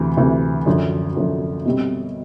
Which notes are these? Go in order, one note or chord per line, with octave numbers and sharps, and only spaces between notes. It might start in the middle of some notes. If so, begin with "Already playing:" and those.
Already playing: D2 C3 E3
D2 C3 E3
F#2 D3 F3
F#2 D3 F3
B2 G3 C4